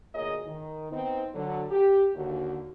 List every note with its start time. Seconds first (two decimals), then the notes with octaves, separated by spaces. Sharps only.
0.14 D2 A#2 G#4 A#4 C#5 D#5
0.46 D#3
0.91 B3 C4 D#4
1.34 D3 F#3
1.71 G4
2.15 D#2 D3 F#4